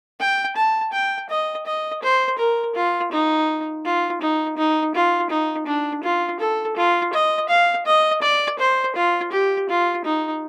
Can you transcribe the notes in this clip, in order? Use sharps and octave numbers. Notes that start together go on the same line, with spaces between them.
G5
A5
G5
D#5
D#5
C5
A#4
F4
D#4
F4
D#4
D#4
F4
D#4
D4
F4
A4
F4
D#5
F5
D#5
D5
C5
F4
G4
F4
D#4